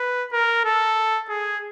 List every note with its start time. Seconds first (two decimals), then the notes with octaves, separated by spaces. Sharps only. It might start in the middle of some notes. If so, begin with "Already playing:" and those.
Already playing: B4
0.32 A#4
0.65 A4
1.29 G#4